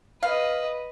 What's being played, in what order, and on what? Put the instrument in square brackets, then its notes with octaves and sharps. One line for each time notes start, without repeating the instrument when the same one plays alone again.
[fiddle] B4 D#5 [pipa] F5